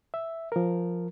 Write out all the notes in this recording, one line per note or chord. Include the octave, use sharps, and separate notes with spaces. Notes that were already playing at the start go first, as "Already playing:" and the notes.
E5
F3 A#4